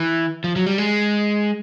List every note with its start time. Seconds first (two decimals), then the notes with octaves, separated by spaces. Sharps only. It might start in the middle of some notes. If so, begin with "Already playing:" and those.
Already playing: E3
0.44 F3
0.56 F#3
0.67 G3
0.78 G#3